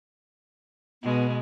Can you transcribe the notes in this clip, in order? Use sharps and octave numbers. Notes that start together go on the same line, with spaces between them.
B2 G#3 B3